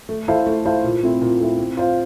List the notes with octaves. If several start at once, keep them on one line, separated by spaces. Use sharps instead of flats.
A3
E4 A4 C5 F5
A3
E4 A4 C5 F5
A#2
A3 C4 E4
A#2
A3 C4 E4
C4
F4 C5 F5